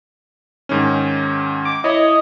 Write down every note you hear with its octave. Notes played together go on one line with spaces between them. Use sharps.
G#2 D#3 C#4
D6
E4 C#5 D#5 B5